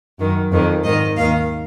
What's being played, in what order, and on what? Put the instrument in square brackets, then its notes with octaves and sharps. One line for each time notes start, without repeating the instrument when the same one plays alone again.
[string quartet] F#2 D#3
F2 D#3
G#2 D#3 D#5
D#2 D#3 F5